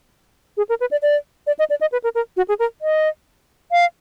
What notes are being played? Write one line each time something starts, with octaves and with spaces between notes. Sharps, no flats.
G#4
A#4
B4
D5
D5
D5
D#5
D5
D#5
B4
A#4
A#4
F#4
G#4
A#4
D#5
F5